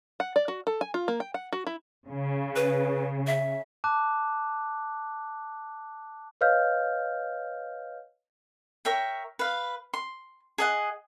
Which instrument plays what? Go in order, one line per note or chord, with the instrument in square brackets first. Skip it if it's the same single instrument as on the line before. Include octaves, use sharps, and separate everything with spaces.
[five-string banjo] F#5
D5
F#4
A4
G#5
F4
A#3
G5
F#5
F#4
E4
[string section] C#3
[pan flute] B4
E5
[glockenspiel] A5 D6 F#6
[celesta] B4 C#5 D#5 F5 F6 G6
[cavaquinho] A#4 C#5 E5 G5
B4 F5
C6
G#4 D#5 F#5